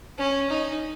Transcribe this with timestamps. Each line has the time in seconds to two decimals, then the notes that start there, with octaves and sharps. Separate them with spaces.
0.18 C#4
0.50 D#4